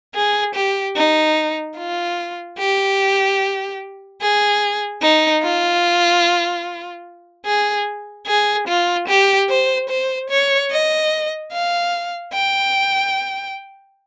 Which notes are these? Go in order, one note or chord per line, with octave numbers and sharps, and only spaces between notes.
G#4
G4
D#4
F4
G4
G#4
D#4
F4
G#4
G#4
F4
G4
C5
C5
C#5
D#5
F5
G5